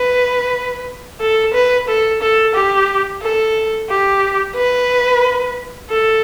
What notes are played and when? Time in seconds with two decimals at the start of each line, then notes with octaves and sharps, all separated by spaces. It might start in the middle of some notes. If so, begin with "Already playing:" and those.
Already playing: B4
1.21 A4
1.54 B4
1.88 A4
2.21 A4
2.54 G4
3.22 A4
3.89 G4
4.55 B4
5.90 A4